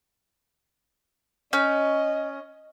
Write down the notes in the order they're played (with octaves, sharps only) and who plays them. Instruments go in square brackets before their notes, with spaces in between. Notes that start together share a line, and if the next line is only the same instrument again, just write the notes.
[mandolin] C#4 G6 [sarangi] D#5